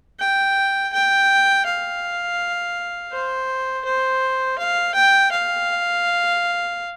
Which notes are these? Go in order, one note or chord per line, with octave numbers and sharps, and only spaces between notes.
G5
G5
F5
C5
C5
F5
G5
F5